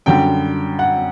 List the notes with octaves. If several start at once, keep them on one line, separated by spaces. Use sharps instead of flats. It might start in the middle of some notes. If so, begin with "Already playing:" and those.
F#2 D3 G3 G5
F#5